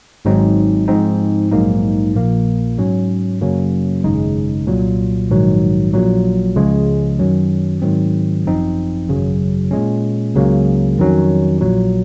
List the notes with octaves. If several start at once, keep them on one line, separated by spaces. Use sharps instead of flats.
G#1 G#2 F#3 C4 D#4
G#2 F3 C4 D#4
A#1 G#2 F#3 A#3 D#4
A#1 A#2 F3 A#3
G#2 F#3 C#4
F#2 C#3 F#3 A#3 C#4
G#1 F#2 C#3 G#3 D#4
C2 A#2 F#3
A#1 G#2 D#3 F#3
A#1 A#2 F#3
C#2 C#3 F3 G#3
F#2 D#3 F#3 C#4
G#2 D#3 F#3 C4
G#1 F#2 F3 C4 D#4
G#1 F#2 C#3 F#3
A#2 G#3 C#4
C#2 C#3 F#3 A#3
F2 D#3 F#3 C#4
A#1 A#2 F#3